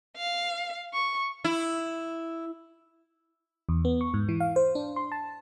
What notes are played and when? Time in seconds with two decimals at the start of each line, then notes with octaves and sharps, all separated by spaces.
0.17 F5
0.94 C#6
1.44 E4
3.69 E2
3.85 B3
4.01 C#6
4.14 G#2
4.29 E3
4.40 F5
4.56 C5
4.75 D4
4.96 C6
5.12 A5